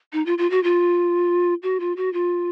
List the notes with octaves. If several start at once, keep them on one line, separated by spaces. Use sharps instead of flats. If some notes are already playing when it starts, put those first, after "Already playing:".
D#4
F4
F4
F#4
F4
F#4
F4
F#4
F4